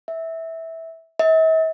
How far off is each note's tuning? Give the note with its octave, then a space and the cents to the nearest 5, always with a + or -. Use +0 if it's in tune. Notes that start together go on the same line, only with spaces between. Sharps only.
E5 -15
E5 -45